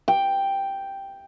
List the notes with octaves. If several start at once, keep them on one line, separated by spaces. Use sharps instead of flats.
G5